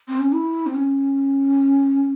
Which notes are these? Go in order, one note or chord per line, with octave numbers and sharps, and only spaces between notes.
C4
C#4
E4
C4
C#4